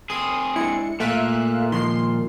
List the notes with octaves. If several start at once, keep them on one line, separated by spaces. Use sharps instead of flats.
C4 G#4 D#6
G#3 D4 E4 C#7
A#2 A3 E5 F5 F#6
D#3 F3 G#3 C6 C7